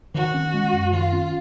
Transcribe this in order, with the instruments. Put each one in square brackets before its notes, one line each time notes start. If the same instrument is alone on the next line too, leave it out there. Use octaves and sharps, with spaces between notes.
[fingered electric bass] D#3 [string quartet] F#4
[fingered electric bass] C#4
G#3
F#2
[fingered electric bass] D#3 [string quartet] F4
[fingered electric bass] C#4